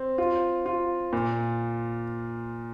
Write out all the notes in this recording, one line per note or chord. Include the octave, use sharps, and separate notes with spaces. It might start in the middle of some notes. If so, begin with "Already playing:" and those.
Already playing: C4
F4
F4
A#2